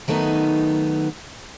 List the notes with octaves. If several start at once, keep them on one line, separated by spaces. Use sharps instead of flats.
D#3 F#3 A3 B3 D#4